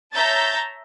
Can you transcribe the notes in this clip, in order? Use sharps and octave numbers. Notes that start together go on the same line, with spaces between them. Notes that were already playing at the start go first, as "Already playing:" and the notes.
C#5 E5 A5 A#5 G6 A6